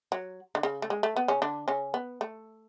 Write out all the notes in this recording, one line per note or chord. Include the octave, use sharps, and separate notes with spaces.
F#3
D3
C#3
A3
G#3
A3
B3
C#3 C#4
D3 D4
C#3 C#4
B3
A3